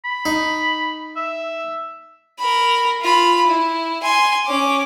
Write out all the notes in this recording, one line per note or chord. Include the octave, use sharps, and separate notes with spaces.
B5
D#4
E5
A#4 B5
F4 B5
E4
G#5 C6
C#4 D6